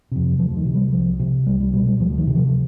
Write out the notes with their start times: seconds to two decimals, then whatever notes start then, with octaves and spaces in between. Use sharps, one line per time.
0.11 F2 C3
0.39 D2 F3
0.56 D#3
0.65 C3
0.75 G3
0.93 C2 F3
1.20 C3
1.47 C2 G3
1.60 G3
1.73 B2 G3
1.86 G3
2.00 D2 F3
2.18 D#3
2.27 C3
2.35 F3